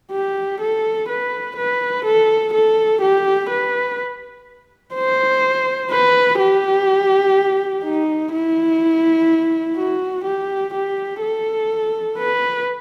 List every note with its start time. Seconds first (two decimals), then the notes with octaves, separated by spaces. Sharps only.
0.12 G4
0.60 A4
1.08 B4
1.57 B4
2.05 A4
2.53 A4
3.01 G4
3.49 B4
4.94 C5
5.91 B4
6.39 G4
7.84 D#4
8.32 E4
9.77 F#4
10.25 G4
10.74 G4
11.22 A4
12.18 B4